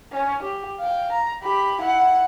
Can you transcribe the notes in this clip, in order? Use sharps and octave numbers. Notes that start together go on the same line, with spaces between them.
C#4
G4
F5 G5
A#5
G4 B5
E4 F#5